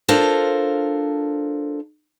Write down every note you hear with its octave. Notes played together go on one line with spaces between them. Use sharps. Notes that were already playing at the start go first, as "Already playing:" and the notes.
D4 F4 A4 A#4 C5 F5